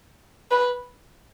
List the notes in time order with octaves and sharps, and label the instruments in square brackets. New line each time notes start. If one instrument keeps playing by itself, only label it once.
[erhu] B4